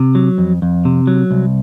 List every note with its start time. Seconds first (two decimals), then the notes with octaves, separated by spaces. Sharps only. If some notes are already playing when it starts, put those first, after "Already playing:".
Already playing: C3
0.15 F#3
0.38 F2
0.62 F2
0.85 C3
1.07 F#3
1.31 C2